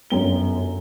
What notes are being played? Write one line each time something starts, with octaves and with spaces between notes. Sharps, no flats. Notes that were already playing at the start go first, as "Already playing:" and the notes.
G1 F#2 G7